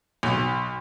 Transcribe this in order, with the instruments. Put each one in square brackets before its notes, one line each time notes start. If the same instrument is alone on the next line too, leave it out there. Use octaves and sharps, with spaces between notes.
[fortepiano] B1